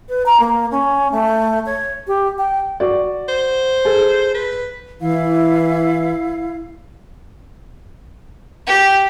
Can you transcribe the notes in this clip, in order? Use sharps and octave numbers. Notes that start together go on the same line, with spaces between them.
B4
A#5
A#3
C#4
A3
C#5
G4
G5
F#4 D5
C5
G#4 A4
B4
E3 E4 F5
G4